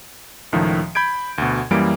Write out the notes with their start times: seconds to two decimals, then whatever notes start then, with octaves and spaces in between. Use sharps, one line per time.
0.53 C#2 A2 D#3 F3
0.95 B5 G6 G#6 D7
1.38 D2 B2
1.71 F#2 E3 G3 A#3 D7